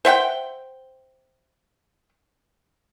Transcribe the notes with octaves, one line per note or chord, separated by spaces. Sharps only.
C5 E5 F#5 G5